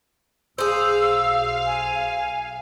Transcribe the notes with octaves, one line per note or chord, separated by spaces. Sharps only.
B1 G#4 C5 F5 E6
G#5